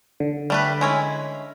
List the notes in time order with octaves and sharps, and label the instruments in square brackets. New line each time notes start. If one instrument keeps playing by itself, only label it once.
[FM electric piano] D3
[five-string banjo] G3 A3 B4
G#3 C#4 E4